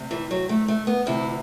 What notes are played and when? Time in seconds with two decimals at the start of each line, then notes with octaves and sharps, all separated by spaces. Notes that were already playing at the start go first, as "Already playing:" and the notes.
Already playing: D2 C3
0.11 E3
0.31 F#3
0.49 A3
0.68 A3
0.87 B3
1.06 D2 C3 E3 E4